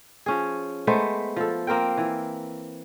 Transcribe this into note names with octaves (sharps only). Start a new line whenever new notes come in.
F3 C#4 G#4
G#3 A3 B3 C5
F3 A4
A#3 C4 A#4 G5
E3